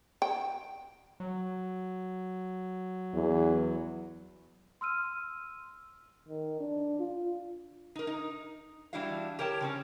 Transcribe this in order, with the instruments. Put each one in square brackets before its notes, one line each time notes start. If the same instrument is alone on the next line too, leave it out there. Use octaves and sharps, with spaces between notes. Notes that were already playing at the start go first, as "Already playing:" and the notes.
[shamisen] G5
[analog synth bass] F#3
[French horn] E2
[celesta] C6 E6 F6 D#7
[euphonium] D#3
D4
F4
[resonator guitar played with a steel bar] D#4 A#4
D#4
E3 G3 D4 E4 F#4 F5
G4 A#4 C#5 G5 A5
C#3 C4 C#4